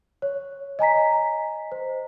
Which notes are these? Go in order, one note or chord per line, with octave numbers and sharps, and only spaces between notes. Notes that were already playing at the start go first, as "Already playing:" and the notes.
C#5
D#5 G#5 A#5 B6
C5